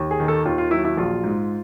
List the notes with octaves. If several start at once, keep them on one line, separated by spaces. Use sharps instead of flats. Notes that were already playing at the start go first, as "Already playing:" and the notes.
Already playing: D#2
G#4
D#3
A4
D#2 F4
F4
F#3 E4
E4
A#1 F4
G#2